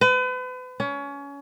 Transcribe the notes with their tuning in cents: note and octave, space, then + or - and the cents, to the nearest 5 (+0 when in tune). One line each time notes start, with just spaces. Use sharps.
B4 +40
C#4 +25